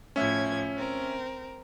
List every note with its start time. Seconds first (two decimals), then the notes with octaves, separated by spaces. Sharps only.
0.16 A2 F3 C#4 E5 G#6
0.76 C4 A#4